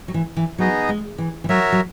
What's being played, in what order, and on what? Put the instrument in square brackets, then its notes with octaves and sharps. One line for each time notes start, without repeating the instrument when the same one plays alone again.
[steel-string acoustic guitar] F#3
E3
E3
[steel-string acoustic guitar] F#3 [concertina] B3 D#4 G#4 D#5
[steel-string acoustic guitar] G#3
E3
E3
[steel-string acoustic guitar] F#3 [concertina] F#4 A#4 C#5 E5
[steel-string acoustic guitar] F#3